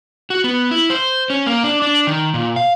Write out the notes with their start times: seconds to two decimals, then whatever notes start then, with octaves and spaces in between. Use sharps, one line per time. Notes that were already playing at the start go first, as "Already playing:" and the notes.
0.30 F#4
0.44 B3
0.71 E4
0.90 C5
1.30 C#4
1.46 A#3
1.64 D4
1.82 D4
2.07 D#3
2.34 A#2
2.56 F5